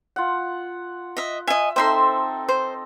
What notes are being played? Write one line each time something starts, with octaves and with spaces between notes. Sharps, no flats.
F4 F#5
D#5 E5
D#5 E5 G#5
C4 D#4 A4 C5 E5 C6
C5